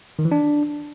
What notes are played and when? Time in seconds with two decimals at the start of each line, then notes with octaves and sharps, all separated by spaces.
0.19 D#3
0.25 E3
0.32 D4